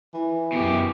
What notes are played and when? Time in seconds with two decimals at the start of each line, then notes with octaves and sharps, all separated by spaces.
0.14 E3
0.52 F#2 B2 G4